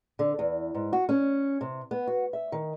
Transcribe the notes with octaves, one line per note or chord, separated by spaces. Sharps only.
D3
E2
G#2
F#4
C#4
C3
B3
F#4
E5
D#3